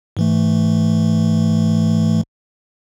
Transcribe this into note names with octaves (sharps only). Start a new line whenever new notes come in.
G#2 E3 A3